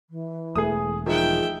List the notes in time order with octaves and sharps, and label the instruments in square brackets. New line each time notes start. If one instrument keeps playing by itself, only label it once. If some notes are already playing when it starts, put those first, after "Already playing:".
[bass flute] E3
[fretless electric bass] E1 A3 [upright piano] G#4 D#6
[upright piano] D#3 F3 [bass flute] G#4 [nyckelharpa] E5 G5